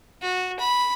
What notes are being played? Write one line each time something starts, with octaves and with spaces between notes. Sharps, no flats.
F#4
B5